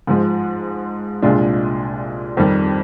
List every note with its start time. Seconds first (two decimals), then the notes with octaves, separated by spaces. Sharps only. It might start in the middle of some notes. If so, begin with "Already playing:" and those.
0.07 G#2 F3 G#3
1.22 C2 A#2 G#3 D4 F4
2.37 F2 D#3 G3